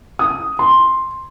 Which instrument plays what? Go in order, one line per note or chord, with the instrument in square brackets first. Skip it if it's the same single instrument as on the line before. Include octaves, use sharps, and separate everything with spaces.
[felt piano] D#6
C6